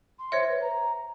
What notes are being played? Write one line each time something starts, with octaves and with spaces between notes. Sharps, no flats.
C6
C5 C#5 E5
B4
A#5